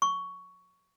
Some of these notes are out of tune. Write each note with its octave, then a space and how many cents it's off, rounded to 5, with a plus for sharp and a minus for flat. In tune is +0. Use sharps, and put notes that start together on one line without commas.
C#6 +10